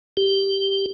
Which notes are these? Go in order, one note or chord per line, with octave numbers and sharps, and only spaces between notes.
G4